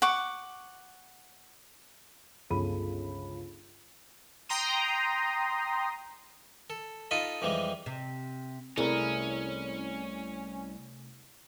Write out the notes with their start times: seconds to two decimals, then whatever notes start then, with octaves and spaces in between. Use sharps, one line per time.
0.02 F#5 C#6 D6
2.50 G1 C#2 G#4 A4 B5 D#7
4.49 G5 A#5 C6 D#6
6.70 A4
7.11 D#4 F4 A4 D#5 B5
7.42 F2 E3 G3 G#3
7.86 C3
8.78 C2 C3 A3 C#4 E4 G#4 A#4